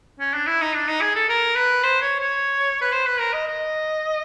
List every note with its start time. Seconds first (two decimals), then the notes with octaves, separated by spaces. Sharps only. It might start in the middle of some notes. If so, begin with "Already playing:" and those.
0.20 C#4
0.34 D4
0.47 E4
0.61 D#4
0.75 D4
0.88 D#4
1.01 G#4
1.15 A4
1.29 A#4
1.56 B4
1.84 C5
2.02 C#5
2.20 C#5
2.82 B4
2.92 C5
3.06 B4
3.20 A#4
3.33 D#5
3.47 D#5